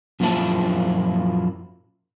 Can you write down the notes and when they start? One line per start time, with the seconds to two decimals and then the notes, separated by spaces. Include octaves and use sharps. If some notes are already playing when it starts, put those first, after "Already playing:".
0.20 F#2 A#2 F3 A#3 E4 A5